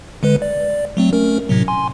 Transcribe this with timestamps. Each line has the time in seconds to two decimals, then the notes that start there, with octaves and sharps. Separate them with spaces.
0.23 D3 G#3 B4
0.42 D5
0.97 F#3 A3 C4
1.13 A3 C#4 A#4
1.49 A2 C3 F#3
1.68 G#5 C6